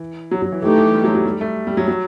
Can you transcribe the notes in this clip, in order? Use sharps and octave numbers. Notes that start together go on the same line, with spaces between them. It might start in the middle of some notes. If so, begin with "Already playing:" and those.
Already playing: E3
F#3
F#3
E3
E3 A3 D#4 G4
E3
G3
F#3
F#3
G3
A3
G3
F#3
F#3